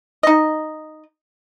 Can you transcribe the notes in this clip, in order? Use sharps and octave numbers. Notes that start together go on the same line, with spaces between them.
D#4 D#5